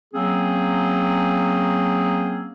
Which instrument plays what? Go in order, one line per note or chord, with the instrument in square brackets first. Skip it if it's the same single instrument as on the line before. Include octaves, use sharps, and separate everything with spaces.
[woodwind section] F#3 A#3 C4 C#4 G#4